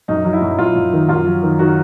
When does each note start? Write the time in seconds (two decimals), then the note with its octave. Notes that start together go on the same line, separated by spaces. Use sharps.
0.08 F#2 D#4
0.25 F#3
0.33 E4
0.42 F#2
0.59 F#2 F4
0.76 F#2
0.93 D#3
1.09 F#2 F4
1.26 F#3
1.43 D#3
1.59 D#3 F#4